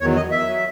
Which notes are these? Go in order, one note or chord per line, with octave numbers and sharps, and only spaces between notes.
E2 D#3 F#3 C#5
D#5
E5
F#3